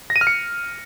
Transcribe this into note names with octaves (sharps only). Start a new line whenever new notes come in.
A#6
D#7
F6
C#7